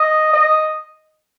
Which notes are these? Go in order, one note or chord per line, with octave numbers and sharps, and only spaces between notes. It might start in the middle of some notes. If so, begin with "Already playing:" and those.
Already playing: D#5
D#5